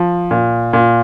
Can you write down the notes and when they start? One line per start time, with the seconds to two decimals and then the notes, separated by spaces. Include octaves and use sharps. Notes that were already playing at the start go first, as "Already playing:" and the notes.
Already playing: F3
0.31 A#2
0.73 A#2